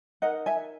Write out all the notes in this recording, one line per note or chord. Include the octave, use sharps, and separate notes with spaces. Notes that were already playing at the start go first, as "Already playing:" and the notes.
D#4 A#4 D#5 F#5
E5 G#5